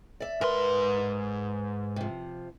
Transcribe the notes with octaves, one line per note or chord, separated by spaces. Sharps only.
D5 E5
G#2 A#4 B4 C6
C3 F3